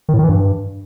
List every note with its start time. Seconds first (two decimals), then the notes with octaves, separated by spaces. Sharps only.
0.09 D#3
0.14 A2
0.19 D#3
0.24 E3
0.29 G2